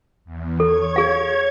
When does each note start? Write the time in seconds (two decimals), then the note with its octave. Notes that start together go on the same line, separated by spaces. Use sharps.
0.25 E2
0.60 A4 C#5 G#6
0.96 G#4 F5